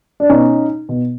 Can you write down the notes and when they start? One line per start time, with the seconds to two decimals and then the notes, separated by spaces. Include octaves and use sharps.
0.20 D4
0.30 B2 C#4 D#4
0.89 B2